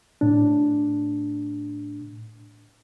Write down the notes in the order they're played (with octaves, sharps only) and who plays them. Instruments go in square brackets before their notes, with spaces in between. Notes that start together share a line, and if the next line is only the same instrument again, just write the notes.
[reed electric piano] A2 D4